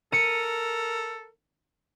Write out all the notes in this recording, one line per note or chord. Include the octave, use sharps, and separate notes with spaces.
A4 A#4 C#7 D#7